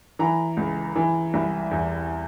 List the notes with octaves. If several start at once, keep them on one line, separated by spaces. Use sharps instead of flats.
E3 A#5
C#2
E3
C2
E2